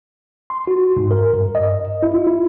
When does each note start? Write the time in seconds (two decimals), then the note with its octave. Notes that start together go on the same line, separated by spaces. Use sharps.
0.50 C6
0.67 F#4
0.97 G#2
1.11 A#4
1.33 G2
1.55 D#5
2.03 E4
2.14 F4
2.27 E4